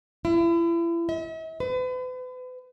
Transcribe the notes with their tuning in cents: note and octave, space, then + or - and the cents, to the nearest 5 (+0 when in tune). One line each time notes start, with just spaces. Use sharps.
E4 +35
E5 -45
B4 +40